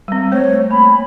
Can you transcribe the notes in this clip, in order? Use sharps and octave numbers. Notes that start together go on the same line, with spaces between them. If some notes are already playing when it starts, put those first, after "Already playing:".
G3 C4
A3 C5 C#5
A#3 B5